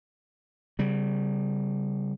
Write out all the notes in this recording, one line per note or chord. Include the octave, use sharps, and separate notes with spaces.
C#3 G3